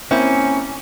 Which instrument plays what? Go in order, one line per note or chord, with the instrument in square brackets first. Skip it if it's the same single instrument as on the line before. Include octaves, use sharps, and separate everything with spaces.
[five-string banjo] A#3 C4 E4 [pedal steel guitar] C#4